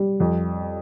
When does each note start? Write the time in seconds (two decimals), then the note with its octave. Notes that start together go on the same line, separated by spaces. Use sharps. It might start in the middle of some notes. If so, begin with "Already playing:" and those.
Already playing: G3
0.20 F2